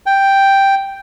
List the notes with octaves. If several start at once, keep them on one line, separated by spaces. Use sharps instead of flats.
G5